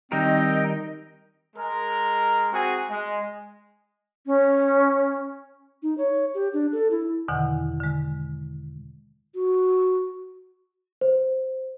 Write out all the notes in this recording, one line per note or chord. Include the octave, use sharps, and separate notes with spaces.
D#3 G3 C4 D#4 A#4 D#5 G5
G#3 A#4
C4 F#4 G#4 G#5
G#3
C#4
D#4
C#5
G4
D4
A4
E4
E2 B2 D3 D#3 E4 F#5
D3 G#3
F#4
C5